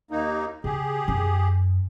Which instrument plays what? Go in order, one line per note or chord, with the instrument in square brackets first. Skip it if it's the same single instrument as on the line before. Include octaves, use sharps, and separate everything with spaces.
[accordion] D#2 A#3 D#4
[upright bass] C#3 [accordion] G4 G#4
[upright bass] F#2 D#4